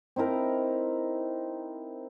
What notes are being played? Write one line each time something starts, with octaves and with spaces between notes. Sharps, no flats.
C4 D#4 E4 A#4